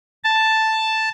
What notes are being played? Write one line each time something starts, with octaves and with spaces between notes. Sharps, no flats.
A5